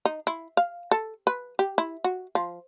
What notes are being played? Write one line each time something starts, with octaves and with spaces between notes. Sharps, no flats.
D#4
E4
F5
A4
B4
G4
E4
F#4
F3